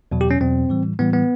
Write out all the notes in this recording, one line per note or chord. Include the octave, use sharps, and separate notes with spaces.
E2 B2 F#3
G4
C#4
E2 B2 F#3 C4
A2 E3 G3
A2 E3 G3 B3
B3